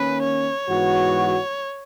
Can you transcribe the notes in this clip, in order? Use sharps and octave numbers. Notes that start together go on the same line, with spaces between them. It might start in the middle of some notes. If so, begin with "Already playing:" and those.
Already playing: D#3 A#3 C#4 B4
C#5
G#2 E3 B3 F#4